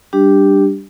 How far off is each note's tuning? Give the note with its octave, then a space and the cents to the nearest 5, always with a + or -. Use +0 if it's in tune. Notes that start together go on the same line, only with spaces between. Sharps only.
G3 +0 D4 +0 G4 +0